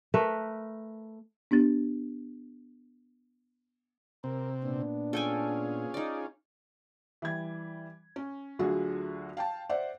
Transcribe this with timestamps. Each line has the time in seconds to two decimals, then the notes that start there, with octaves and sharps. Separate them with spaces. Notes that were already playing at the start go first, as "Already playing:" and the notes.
0.14 A3 A#4 B4
1.51 B3 D4 G4 A6
4.24 C3 C4 A#4
4.63 A#2 B3 D4
5.13 C#4 F4 G#4 A4 G5 G#5
5.94 D#4 D5
7.22 E3 G3 G#6
8.16 C#4
8.59 D2 D3 F#3 F4 F#4 G#4
9.37 F5 G5 A5
9.69 C5 D5 E5 F#5